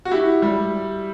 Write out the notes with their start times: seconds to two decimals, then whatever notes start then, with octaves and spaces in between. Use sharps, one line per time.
0.05 F#4
0.11 E4 G4
0.42 G3